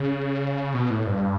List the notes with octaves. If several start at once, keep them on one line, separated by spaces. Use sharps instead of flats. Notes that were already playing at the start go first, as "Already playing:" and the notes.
Already playing: C#3
B2
A2
G2